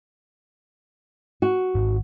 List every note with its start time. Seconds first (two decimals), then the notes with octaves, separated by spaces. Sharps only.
1.42 F#4
1.75 G#1